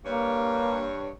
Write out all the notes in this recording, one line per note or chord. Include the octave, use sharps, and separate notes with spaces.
G2 A#3 C#5